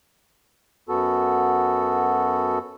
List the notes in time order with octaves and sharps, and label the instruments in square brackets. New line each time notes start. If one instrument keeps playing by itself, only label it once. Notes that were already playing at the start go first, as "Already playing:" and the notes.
[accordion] F#2 B3 F#4 A4